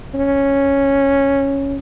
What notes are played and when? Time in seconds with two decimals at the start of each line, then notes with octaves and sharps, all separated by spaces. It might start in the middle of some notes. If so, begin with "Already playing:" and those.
0.14 C#4